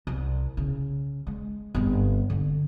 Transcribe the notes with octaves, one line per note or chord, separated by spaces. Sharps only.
C2
C#3
G#3
G1 C4
D3 C4